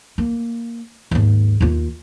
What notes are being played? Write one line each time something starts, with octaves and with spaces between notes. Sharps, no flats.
A#3
D#2 G#2
D#2 F4